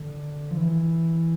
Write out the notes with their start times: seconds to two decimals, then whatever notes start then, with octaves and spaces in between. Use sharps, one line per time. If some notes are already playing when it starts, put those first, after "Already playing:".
Already playing: D3
0.51 F3
0.57 E3